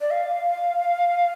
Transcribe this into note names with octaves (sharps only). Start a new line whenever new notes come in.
D5
F5